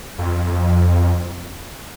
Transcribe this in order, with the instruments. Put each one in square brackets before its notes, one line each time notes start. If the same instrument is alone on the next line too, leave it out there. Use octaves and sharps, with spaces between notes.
[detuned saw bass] F2